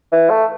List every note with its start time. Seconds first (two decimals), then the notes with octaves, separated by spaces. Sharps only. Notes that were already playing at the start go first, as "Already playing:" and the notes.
0.12 E3
0.30 A3